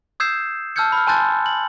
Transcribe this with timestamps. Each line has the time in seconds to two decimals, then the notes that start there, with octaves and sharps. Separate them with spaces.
0.20 D#6 E6 G6 G#6 C7 E7
0.76 A5 E6 F6 G6 G#6 C#7
0.92 B5 F6
1.07 G#5 A5 C6 F#6 G6 A6
1.46 F#7